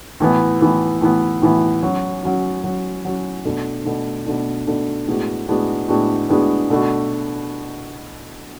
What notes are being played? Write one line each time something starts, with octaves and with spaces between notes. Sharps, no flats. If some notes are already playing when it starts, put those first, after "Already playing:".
A2 E3 B3
A2 E3 B3
A2 E3 B3
A2 E3 B3
F#3 C#4 F#4
F#3 C#4 F#4
F#3 C#4 F#4
F#3 C#4 F#4
B2 A3 D4
B2 A3 D4
B2 A3 D4
B2 A3 D4
A2 G#3 B3 D4 F#4
A2 G#3 B3 D4 F#4
A2 G#3 B3 D4 F#4
A2 G#3 B3 D4 F#4
B2 A3 D4 F#4